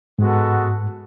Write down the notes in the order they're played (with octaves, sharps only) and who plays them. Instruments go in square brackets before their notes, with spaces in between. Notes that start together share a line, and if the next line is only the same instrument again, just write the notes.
[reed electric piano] G#2 [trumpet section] G#3 B3 F#4 A4